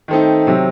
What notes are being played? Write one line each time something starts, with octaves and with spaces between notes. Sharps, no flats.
D#3 A3 C4 D#4
C3 F#3 C4